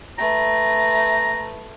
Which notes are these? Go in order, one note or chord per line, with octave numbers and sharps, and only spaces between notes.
A3 B4 A#5